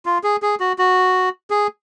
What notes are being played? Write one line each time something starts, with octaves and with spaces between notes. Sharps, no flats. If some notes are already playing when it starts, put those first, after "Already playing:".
F4
G#4
G#4
F#4
F#4
G#4